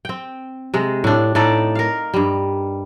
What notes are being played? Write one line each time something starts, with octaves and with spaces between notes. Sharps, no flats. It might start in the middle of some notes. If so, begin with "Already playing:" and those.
C4 G5
C3 G#3
A2 D4
A2 D#4 A4 D5
A#4 F5
G2 G3